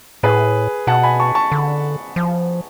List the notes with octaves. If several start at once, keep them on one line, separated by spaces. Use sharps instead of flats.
A2 G#4 B4
B2 F#5 A5
G#5 B5
A5 C#6
A5 C#6
D3
F3